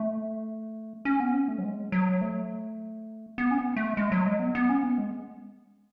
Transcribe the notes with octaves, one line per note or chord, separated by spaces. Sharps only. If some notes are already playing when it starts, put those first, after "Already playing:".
Already playing: A3
C#4
B3
C#4
A3
F#3
G#3
F#3
A3
B3
C#4
B3
A3
G#3
F#3
G#3
B3
B3
C#4
B3
G#3